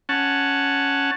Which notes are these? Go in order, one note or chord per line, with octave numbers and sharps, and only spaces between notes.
C#4 F#5 A5